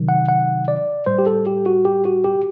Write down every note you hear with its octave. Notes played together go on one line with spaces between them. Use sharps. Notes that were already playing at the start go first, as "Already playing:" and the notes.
Already playing: C3 D#3 F#3
F#5
F#5
D5
A2 G3 C5
G4
A4
G4
F#4
G4
F#4
G4